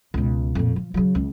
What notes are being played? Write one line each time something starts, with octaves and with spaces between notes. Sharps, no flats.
C#2 B2
F2 A#2
F3
C#3 F#3
C#2